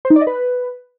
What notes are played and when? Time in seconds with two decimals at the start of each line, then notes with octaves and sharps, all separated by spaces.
0.05 C5
0.10 D#4
0.16 D5
0.21 D#5
0.27 B4